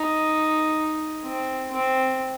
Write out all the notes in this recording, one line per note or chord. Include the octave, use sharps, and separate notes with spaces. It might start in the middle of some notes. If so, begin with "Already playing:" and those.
Already playing: D#4
C4
C4